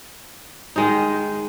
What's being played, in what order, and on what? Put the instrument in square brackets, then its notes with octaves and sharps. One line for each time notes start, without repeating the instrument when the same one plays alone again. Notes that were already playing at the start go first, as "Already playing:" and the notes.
[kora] D#3 G#3 D#4